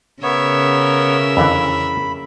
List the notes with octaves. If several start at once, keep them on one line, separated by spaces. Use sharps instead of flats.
C#3 B3 A#4 C#5 E5
F2 D3 E3 B5